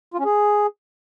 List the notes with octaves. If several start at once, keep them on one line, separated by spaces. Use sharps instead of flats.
F4
C#4
G#4